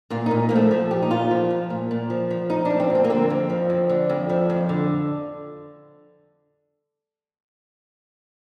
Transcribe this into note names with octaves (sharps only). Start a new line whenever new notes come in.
A#2 F4
D#4
A#2
F3 A#3
A3
F3
A#2 G4
D#4
A#2 F4
F3
F3
A#2
A#2
F3
F3
F2 D#4
D4
F3
C4
F2 C4
A#3
D3 C4
F2
F3
F2
D3
F2
F3
F2
D3